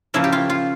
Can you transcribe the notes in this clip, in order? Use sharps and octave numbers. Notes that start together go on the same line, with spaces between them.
C#3 F3 A#3 C#4 E4
G4
F4
F4